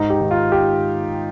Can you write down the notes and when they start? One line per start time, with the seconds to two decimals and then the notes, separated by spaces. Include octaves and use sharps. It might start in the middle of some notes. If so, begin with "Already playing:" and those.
Already playing: G#2 D#4
0.10 G4
0.20 D#3
0.31 F4
0.52 G4